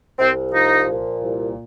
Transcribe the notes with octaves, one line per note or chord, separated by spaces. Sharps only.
C2 C4
F3 D#4
A#2
C2